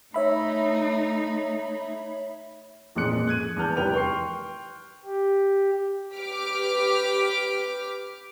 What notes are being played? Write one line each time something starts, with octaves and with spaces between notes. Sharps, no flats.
A3 D#4 C#5 E5 B5
A1 F2 A#2 G#3 F#6 C#7
F#6 G#6 D#7
E2 A5 F6 G6
F1 G3 A#4 B4 G5 F7
G5 C6 C#6 C7
G4
G4 B4 D6 F6 B6 D7